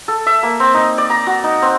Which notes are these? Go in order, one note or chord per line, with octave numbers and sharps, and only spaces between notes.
A4
E5
A#3
C4
D#4
D5
A#5
F#4
D#4
C4